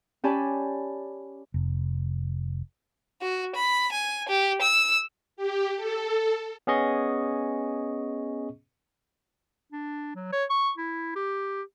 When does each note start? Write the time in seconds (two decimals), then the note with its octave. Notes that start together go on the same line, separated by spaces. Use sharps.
0.24 C#4 G4 D5 G#5 A5 B5
1.54 F1
3.22 F#4
3.55 B5
3.92 G#5
4.29 G4
4.62 E6
5.37 G4
5.76 A4
6.67 B3 C#4 G#4 D#5 C#6
9.72 D4
10.15 F#3
10.33 C#5
10.50 C#6
10.77 E4
11.16 G4